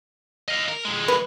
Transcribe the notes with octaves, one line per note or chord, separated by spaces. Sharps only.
D#5 F5
A#4
F2 G#3
B4